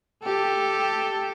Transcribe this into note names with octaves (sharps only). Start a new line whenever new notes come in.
G4 A4